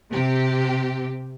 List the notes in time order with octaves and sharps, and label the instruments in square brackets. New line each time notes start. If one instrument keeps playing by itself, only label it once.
[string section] C3 G4